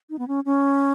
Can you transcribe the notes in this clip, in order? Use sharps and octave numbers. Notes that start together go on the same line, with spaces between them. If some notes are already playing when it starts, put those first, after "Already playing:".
D#4
B3
C#4
C#4